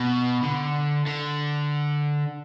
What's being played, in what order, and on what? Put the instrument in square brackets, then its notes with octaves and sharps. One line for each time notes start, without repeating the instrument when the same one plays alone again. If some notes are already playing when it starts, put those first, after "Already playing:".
Already playing: [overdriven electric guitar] B2
D3
D3